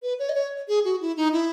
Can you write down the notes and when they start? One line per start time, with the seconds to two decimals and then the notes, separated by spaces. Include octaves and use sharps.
0.03 B4
0.19 C#5
0.29 D#5
0.35 C#5
0.68 G#4
0.85 F#4
1.01 E4
1.17 D#4
1.32 E4